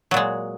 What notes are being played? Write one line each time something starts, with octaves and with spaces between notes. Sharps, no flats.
A#2 F#3 G#3